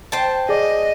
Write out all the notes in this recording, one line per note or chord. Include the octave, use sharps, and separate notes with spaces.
C5 G5 A5
G#4 D5 D#5